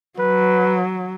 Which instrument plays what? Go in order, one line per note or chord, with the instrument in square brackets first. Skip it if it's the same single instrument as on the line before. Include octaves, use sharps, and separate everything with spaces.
[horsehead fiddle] F#3 [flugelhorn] B4